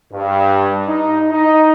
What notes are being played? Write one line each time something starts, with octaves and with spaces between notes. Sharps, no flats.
G2
D#4
D#4